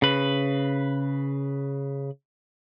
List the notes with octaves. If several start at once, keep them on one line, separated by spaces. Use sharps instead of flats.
C#3 B4